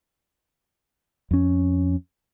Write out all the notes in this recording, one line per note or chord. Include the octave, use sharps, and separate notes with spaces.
F2 C#4